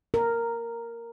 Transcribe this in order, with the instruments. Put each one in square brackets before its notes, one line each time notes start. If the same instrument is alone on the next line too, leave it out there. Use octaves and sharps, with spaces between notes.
[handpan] A#4